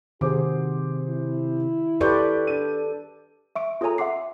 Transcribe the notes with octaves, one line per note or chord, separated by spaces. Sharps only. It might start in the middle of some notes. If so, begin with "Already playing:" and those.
C3 D#3 F#4 G#4 C5 D6
E4
G4 A4 B4 D5 C6 C#6 G6
D4 D#7
E5 C#6 D7
F4 G#4 A4 C#5 G#5 A#5
E5 F#5 C6 D6 C7